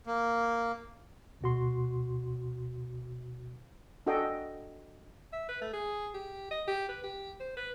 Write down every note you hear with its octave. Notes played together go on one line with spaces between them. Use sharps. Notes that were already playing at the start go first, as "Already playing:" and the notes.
A#3
D2 B2 F#4 C6
D4 F#4 A4 D#5 G5
E5
B4
A3
G#4
G4
D#5
G4
B4
G4
C5
B4